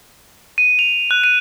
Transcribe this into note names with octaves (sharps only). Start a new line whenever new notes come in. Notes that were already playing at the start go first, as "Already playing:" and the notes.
D#7
F7
F#6
D#7